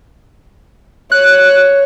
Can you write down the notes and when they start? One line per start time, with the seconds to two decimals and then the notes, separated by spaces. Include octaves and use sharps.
1.12 C#5 F#6